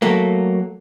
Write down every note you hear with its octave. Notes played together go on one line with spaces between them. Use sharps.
F#3 A3 A#3